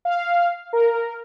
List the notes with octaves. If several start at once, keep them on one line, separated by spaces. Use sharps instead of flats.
F5
A#4